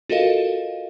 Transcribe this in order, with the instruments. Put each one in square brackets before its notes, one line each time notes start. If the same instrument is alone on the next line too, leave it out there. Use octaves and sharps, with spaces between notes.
[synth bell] F4 F#4 A4 A#4 D#5 F5